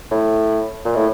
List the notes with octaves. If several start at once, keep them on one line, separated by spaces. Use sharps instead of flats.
A2
A#2
A2